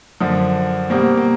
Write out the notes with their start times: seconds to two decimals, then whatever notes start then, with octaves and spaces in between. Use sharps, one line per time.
0.21 F#2 D3 F3
0.90 B2 G3 A#3 C4
1.17 A#3